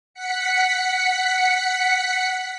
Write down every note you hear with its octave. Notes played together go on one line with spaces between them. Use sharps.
F#5 B6 C#7